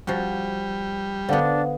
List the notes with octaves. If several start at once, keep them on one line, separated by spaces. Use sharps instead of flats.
F3 G3 F#4
D3 B3 D4 C5 F5 F#5